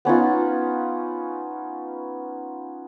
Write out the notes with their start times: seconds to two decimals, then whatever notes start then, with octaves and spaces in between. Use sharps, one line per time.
0.05 B3 C#4 D#4 F4